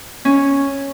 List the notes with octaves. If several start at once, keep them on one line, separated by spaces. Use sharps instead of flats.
C#4